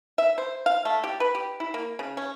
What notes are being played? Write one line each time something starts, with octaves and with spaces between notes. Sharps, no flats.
E5
C5
F5
A3
G4
B4
G4
E4
A#3
C#3
C#4